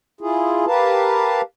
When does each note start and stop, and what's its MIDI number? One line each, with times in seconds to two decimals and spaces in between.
0.21 0.65 64
0.21 0.65 65
0.21 0.65 68
0.67 1.41 67
0.67 1.41 70
0.67 1.41 71
0.67 1.41 77
0.67 1.41 81